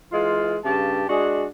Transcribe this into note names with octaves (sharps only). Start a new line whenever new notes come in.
E3 G#3 F4
G2 C#3 G4 A5
G#3 D4 F#4 G#4